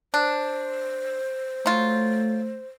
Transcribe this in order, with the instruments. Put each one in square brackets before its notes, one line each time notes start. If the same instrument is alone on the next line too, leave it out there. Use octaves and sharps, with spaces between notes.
[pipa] D4 [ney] C5
[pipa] F#3 F4 [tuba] A3